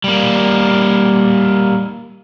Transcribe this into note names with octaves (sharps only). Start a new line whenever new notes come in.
G3 A#3